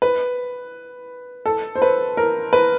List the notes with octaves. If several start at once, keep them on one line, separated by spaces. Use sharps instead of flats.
B4
A4
C5
B4
A#4
B4